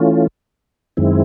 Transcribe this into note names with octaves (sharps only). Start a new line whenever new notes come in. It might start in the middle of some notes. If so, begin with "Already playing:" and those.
Already playing: E3 A3 C#4 F4
F#2 D#3 G#3 C4 E4